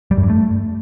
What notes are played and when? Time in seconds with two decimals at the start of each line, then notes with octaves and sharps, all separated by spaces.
0.11 G3
0.17 F#2
0.23 G2
0.30 A3